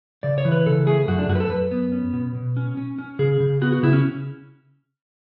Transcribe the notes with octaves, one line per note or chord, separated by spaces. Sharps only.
C#3 D5
C#5
E3
B4
C#3 A4
A3 G#4
F#2 F#4
D4
F#2 F#4
B4
A4
F#2 B4
B3
C#4
B2
B2
C#4
C#4
C#4
C#3 G#4
C#3
B3 F#4
F#4
C#3 E4
C#4